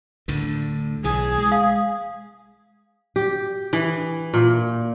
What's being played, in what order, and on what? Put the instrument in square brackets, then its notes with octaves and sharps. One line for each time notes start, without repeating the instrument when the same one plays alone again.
[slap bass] D2 A2 D3
[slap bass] B1 E3 [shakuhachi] G#4
[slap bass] G#3
[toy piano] F5 D#6
[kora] G4
E3
A#2